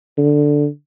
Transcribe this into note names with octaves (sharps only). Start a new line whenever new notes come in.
D3